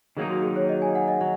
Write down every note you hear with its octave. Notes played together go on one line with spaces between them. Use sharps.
D#3 F#3 A#3 D#4 G#4
F#4
G#4
C#5
D#5
G#5
F#5
D#5
F#3 F#5